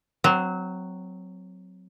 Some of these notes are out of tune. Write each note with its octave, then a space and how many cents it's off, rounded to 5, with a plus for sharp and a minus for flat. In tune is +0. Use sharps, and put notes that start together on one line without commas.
F#3 +0 C4 -20